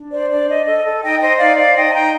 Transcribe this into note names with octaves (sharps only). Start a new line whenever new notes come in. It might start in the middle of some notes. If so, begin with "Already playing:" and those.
Already playing: D4
C5 D5
D4 D5
D4 D#5
A4 D#5
A4
D#4 D#5 G5
C5 D#5
D#4 D5 F5
C5 D5 F5
D#4 D#5 G5
A5
D#4 G5 A#5